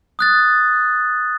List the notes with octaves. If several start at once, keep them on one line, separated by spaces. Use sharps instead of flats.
D#6 F#6 A6